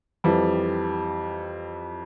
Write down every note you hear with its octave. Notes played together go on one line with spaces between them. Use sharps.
F2 E3 G3